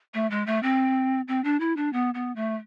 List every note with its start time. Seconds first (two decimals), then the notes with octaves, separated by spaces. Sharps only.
0.14 A3
0.31 G#3
0.47 A3
0.63 C4
1.28 C4
1.44 D4
1.60 E4
1.77 D4
1.93 B3
2.14 B3
2.36 A3